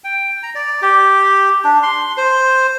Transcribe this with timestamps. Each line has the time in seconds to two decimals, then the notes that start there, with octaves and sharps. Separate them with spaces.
0.04 G5
0.43 A#5
0.55 D5
0.82 G4
1.64 D4
1.83 C6
2.17 C5